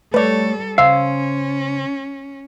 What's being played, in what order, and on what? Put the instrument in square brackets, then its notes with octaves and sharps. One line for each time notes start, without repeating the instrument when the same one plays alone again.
[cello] G3 A4 [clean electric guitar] A3 C#5 [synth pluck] B4 D5
[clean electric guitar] C#3 C5 [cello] C#4 [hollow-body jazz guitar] F5 [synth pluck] E6